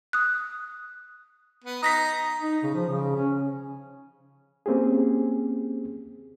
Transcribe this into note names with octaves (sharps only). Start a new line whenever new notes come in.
D#6 F#6
B3
D#4 A#5 D#6 A#6 B6
D#4
C#3
F3
C#3
C#4
A#3 C4 C#4 G4 G#4